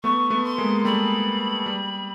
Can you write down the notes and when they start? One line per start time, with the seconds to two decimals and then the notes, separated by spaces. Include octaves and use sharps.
0.04 A3 B3 C#6
0.30 A3 B3
0.45 C6
0.58 G#3 A#3
0.85 G3 A3 B5
1.66 G3